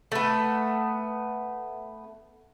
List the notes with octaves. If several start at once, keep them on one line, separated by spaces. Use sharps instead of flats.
A3 B3